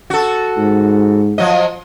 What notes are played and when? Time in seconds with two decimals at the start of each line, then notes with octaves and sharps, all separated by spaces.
0.10 F#4 A4
0.57 G#2
1.38 F3 F#3 D#5